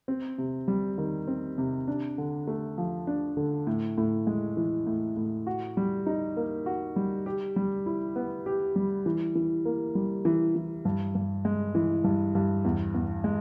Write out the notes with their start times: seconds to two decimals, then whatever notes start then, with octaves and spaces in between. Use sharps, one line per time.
0.08 C4
0.38 C3
0.68 G3
0.98 D#3
1.28 C4
1.58 C3
1.88 D4
2.18 D3
2.47 A3
2.78 F3
3.07 D4
3.37 D3
3.67 A2
3.98 A2
4.27 G#3
4.57 E3
4.86 A2
5.17 A2
5.47 F#4
5.77 G3
6.06 D#4
6.37 A#3
6.66 F#4
6.96 G3
7.26 G4
7.56 G3
7.86 E4
8.16 B3
8.46 G4
8.76 G3
9.06 E3
9.35 E3
9.65 A#3
9.95 G3
10.25 E3
10.55 E3
10.85 G2
11.15 G2
11.45 G#3
11.75 E3
12.04 G2
12.35 G2
12.65 E2
12.94 E2
13.24 G#3